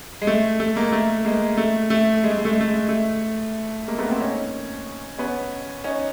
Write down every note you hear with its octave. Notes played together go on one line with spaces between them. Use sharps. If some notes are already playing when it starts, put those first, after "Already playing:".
G#3
A3
A3
G#3 A#3
A3
G#3 A#3
A3
A3
G#3
A3
G#3
A3
G#3
A3
G#3
A3
G#3 A#3
A3 B3
A#3 C4
C#4 D#4
B3 C#4
C#4 D#4